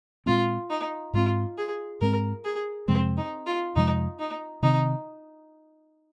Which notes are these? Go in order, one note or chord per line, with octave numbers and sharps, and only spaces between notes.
A#2 G#3 C4 F4
D#4
G#2 G#3 C4 F4
G#4
G#2 G#3 C4 A#4
G#4
F2 C3 F3 G#3 C4
D#4
F4
F2 C3 F3 G#3 D#4
D#4
C3 D#3 C4 D#4